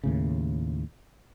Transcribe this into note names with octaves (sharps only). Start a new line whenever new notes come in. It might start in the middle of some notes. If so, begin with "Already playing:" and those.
D#2 A2 C#3